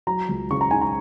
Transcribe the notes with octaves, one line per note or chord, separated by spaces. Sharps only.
F#3 A#5
C#2
C#3 C#6
A#5
D#4 G#5
A#5